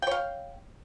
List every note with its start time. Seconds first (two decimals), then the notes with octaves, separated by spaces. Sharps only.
0.02 G5
0.07 C#5
0.11 F5